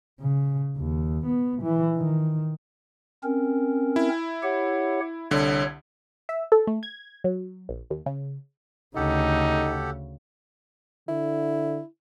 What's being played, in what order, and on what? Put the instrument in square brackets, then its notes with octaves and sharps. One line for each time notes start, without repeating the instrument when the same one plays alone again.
[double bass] C#3
D#2
B3
E3
D#3
[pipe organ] C4 C#4 A#4
[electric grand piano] E4
[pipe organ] G4 C#5 F#5
[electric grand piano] C2 D3 [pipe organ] C#5
[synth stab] E5
A4
A3
G#6
F#3
A#1
D#2
C#3
[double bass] D2 C#3 [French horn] D#4 [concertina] G4 A4 F#5
[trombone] D3 [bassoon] E4